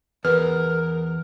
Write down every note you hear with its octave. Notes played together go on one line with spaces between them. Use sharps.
E2 A#4 B4 F6